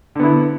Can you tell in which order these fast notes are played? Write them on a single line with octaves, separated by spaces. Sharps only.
D3 B3 E4